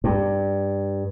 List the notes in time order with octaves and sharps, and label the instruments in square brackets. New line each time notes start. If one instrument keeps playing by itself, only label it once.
[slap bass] G2